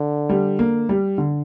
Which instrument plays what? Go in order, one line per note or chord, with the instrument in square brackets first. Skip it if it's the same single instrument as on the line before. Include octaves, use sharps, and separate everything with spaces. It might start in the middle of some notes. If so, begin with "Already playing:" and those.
Already playing: [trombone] D3
[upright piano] G3
A#3
G3
D3